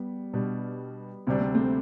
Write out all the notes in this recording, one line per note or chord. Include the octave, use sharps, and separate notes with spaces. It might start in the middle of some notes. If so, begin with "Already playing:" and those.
Already playing: G3 B3
B2 G3 D4
D2 C3 G3 C4 D4
C4
A3 C4